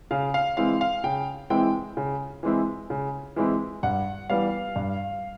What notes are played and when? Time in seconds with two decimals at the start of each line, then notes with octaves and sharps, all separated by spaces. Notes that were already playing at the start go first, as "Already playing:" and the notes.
0.11 C#3 F5
0.34 F5
0.57 E3 G#3 C4 E4 F5
0.81 F5
1.04 C#3 G5
1.50 E3 G#3 C4 E4 G5
1.97 C#3
2.43 E3 G#3 C4 E4
2.90 C#3
3.36 E3 G#3 C4 E4
3.83 G2 F#5
4.30 E3 G3 B3 F5
4.76 G2